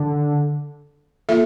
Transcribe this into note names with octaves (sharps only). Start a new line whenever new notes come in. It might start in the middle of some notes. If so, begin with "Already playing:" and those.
Already playing: D3
A#3 F4 A4 E5